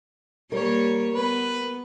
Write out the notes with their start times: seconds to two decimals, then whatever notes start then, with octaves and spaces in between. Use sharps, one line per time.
0.52 G3 A#3 A#4 C#5
1.13 B3 B4